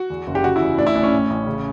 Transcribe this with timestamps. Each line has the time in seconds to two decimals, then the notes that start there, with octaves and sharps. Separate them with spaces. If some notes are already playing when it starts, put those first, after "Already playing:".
Already playing: F#4
0.10 E2
0.27 F#1
0.35 G4
0.44 C#3 F#4
0.56 E4
0.61 E2
0.77 A2 D4
0.87 E4
0.95 A1 D4
1.03 C#4
1.12 A2
1.30 A1
1.46 C#3